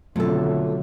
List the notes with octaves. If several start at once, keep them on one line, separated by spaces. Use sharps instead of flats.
F2 B2 D3 D#3 F#3 A3 A4